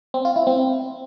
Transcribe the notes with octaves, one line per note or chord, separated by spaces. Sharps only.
C4
F4
E4
C4